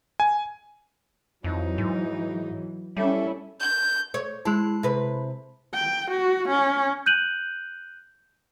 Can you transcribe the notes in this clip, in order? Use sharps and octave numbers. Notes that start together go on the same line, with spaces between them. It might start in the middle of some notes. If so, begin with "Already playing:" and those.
G#5
F2 E3 F#3 D#4
G#2
G3 C#4 E4 A4 E5
G6
C#5
G#3 E4 G#4 A5
C3 B4
G5
F#4
C#4
F#6 G6 D#7 F#7